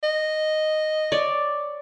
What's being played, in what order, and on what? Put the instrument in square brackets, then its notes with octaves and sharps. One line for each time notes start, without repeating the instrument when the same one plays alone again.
[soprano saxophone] D#5
[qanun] C#5 D5